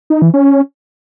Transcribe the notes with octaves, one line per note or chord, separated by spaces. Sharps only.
D#4
E3
C#4